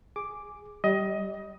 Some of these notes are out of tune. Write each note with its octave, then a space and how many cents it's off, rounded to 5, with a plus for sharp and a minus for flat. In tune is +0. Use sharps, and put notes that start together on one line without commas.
G#4 +0 D6 +0
G3 -15 D#5 +20